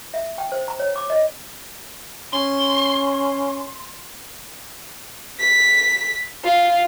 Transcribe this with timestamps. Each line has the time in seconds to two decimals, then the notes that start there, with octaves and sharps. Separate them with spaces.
0.14 E5
0.38 G5
0.52 C5
0.68 A#5
0.80 C#5
0.96 D6
1.10 D#5
2.33 C#4 C6
5.40 B6
6.44 F4